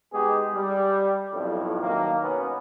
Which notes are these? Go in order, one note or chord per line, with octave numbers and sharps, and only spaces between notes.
G#3 B3 D#4 G4 G#4
G3
B1 F2 A2
D#3 F#3 A#3
B2 B3 C#4